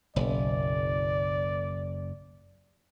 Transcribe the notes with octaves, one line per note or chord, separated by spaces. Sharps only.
F#1 B1 D5